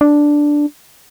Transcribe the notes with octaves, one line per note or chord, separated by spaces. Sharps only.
D4